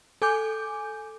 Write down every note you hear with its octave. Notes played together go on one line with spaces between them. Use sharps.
A4 G#5 D6 G6